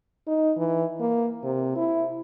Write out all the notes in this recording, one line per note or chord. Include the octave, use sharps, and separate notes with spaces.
D#4
E3
A#3
C3
E4